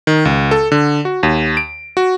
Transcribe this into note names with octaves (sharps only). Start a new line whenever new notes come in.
D#3
C#2
A4
D3
F#4
D#2
D7
F#4